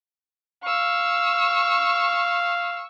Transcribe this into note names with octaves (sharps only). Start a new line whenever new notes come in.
F5 C#6 E6